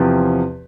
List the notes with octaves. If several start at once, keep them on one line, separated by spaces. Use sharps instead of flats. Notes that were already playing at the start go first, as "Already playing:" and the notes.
Already playing: E2 C3 F3 C4 G4